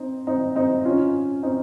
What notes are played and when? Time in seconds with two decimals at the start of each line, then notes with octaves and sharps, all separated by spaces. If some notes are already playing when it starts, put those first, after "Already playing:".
Already playing: C4 D#4
0.27 C4 D#4
0.56 C4 D#4
0.85 C#4 F4
1.43 C4 D#4